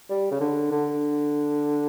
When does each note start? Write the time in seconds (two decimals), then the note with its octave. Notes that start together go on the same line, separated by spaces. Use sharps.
0.10 G3
0.31 C#3
0.41 D3
0.71 D3